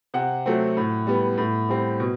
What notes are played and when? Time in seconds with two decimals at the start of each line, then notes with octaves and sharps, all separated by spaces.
0.14 C3 F#5
0.46 F#3 A3 C4
0.77 A2
1.07 G3 B3
1.38 A2
1.69 G3 C4
2.00 B2